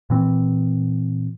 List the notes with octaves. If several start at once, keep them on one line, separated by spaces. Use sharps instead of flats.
A#2 E3 C4